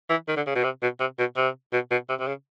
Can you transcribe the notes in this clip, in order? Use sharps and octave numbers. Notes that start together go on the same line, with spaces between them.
E3
D#3
D3
C#3
B2
C3
B2
C3
B2
C3
B2
B2
C3
C3
C#3